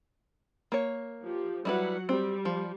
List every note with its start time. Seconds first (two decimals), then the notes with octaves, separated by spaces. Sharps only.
0.72 A#3 C#5
1.23 F3 G4
1.65 F#3 G3 E4 B4 F#5
2.09 G3 C4
2.45 F3